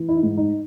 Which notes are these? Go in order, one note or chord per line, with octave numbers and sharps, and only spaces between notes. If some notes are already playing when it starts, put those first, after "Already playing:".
Already playing: E3
E4
D#4
G#2
D#4